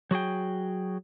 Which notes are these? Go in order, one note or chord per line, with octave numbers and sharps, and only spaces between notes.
F#3 F#4 G#4 G5